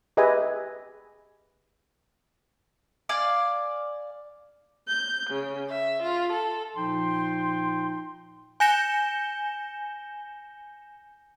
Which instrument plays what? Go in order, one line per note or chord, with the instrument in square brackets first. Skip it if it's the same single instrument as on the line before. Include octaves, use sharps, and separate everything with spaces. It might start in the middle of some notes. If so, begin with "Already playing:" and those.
[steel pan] G4 G#4 B4 D#5 E5 G#5
[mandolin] D5 F5 G#5
[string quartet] G6
C#3
E5
F4
A4
[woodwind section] A#2 F3 D#4 G5 C6
[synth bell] G#5 G6 A#6 C#7 E7 G7